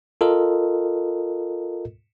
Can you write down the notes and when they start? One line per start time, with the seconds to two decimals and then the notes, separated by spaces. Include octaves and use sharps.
0.21 F4 A4 A#4 D#5